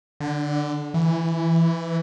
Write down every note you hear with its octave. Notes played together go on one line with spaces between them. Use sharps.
D3
E3